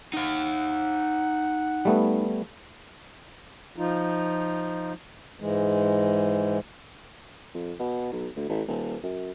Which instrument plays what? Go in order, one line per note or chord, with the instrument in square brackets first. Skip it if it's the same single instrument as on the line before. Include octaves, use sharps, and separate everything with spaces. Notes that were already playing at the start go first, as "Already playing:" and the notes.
[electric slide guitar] D#4 F5 [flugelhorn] F#5
[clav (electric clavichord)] G3 A3 B3
[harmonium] F3 D#4 F4
G#2 E3 G#3
[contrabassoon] F2
B2
B1
D2
A1
D#1
F#2